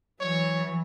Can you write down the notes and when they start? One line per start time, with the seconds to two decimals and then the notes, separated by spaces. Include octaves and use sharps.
0.21 E3 F#3 C#5